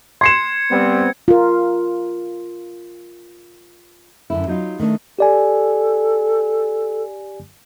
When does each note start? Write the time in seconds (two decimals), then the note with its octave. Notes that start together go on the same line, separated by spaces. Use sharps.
0.21 C6 G#6 C7 C#7 E7
0.70 G3 B3 C4
1.28 F4 A#4
4.30 F#2 D3 E4
4.47 F#3 D#4 F4
4.80 D#3 A3 D4
5.19 G4 A4 D5 G#5